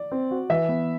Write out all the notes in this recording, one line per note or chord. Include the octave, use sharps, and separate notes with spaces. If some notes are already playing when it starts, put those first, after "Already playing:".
Already playing: D5
C4
F#4
E3 E5
B3